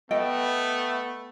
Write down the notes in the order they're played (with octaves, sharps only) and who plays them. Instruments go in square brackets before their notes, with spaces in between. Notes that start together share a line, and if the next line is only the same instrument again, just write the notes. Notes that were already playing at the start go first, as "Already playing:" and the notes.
[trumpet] A3 [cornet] B3 [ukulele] D#5 G5